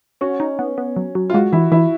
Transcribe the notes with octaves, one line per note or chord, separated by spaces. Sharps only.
C#4 F#4
D#4
B3
B3
F#3
F#3
F4
G#3 F#4
E3 E4
E3 E4